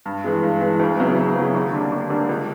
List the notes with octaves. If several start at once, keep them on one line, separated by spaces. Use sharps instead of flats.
G2
E3 G#3
G2
E3 G#3
D2
C#3 F#3 B3 E4
D2
C#3 F#3 B3 E4
D#2
D3 G3 A#3 D4
D#2
D3 G3 A#3 D4
C#2